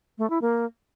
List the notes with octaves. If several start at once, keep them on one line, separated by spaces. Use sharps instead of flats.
A3
E4
A#3